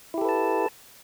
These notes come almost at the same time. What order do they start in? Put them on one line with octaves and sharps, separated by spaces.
E4 G4 A4 B4 A5